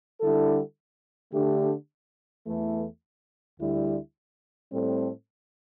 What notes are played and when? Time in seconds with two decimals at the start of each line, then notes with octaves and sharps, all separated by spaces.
0.20 D3 G3 E4 A4
1.33 D3 A3 D4 G4
2.46 E2 E3 A3
3.58 D2 D3 G3 E4
4.72 A2 G3 C4 A4